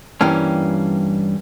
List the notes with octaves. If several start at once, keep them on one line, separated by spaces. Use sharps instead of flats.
G2 E3 G3 A#3 C#4